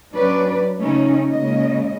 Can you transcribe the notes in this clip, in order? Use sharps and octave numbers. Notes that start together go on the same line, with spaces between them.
F#3 C#4 D4 B4 D5
C#3 A3 C#4 D#4
A#2 C#3 G#3 C#4 D#5